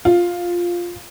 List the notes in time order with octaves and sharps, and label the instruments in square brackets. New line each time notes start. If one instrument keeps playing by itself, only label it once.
[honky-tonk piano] F4